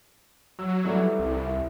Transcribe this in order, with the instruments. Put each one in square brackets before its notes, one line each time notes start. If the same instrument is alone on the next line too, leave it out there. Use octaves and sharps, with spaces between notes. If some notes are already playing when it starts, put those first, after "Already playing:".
[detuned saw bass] F#3 [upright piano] E6
[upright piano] E3 G3 A3
[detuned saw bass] C2
[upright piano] E4